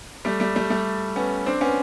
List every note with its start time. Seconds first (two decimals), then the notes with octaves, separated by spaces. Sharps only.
0.25 G3 A3
0.40 G3 A3
0.56 G3 A3
0.70 G3 A3
1.16 B3 C#4
1.46 C4 D4
1.61 B3 C#4